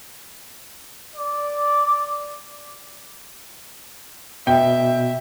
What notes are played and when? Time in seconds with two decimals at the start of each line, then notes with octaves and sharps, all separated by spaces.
1.16 D5
4.47 B2 E5 G5